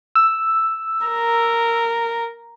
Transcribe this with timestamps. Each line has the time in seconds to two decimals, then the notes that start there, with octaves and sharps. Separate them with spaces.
0.15 E6
1.06 A#4